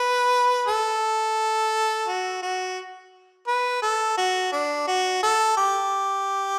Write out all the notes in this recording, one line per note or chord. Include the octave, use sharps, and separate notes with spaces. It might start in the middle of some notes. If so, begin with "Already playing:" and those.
Already playing: B4
A4
F#4
F#4
B4
A4
F#4
D4
F#4
A4
G4